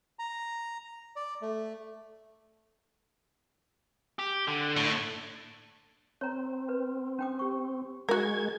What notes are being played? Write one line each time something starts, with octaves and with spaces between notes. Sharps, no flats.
A#5
D5
A3
G4
D3
A2
C4 C#5 A#5
B4
C#4 G5 D#6
G4 C#6
G#3 F#4 A#4 G#6